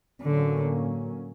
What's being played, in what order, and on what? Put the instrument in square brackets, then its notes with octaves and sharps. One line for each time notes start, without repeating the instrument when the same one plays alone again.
[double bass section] A2 F#3 A#3 C#4 [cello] D3